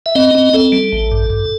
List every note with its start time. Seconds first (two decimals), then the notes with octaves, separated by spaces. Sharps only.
0.06 E5
0.15 C4 D#5
0.35 C4
0.53 C4 A4
0.72 G3
0.92 A1
1.12 G2
1.30 G2